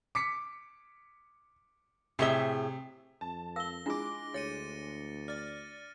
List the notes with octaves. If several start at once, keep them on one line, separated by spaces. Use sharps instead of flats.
D6 B6 C#7
A2 C3 G#4 E5 G7
F2 A5
A#4 F5 E6 A#6 G7
G#3 D4 E4 F4 D6 A#6 D7
D2 C#5 A6 C#7 D#7
D5 F6 A6